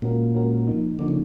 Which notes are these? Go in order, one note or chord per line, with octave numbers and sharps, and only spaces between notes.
A#2 G#3 C#4 F#4 A#4
G#3 C#4 F#4 A#4
F3 A#3 D#4
D3 F3 A#3 D#4
C#3